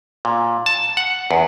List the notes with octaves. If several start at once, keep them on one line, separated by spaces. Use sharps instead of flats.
A#2
A5
F#5
E2